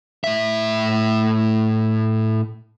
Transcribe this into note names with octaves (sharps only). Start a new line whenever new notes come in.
A2 E5